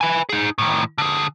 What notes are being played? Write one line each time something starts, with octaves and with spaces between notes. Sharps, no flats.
B4 G#5
D#4 G#4
A2 D#3
D3 G#4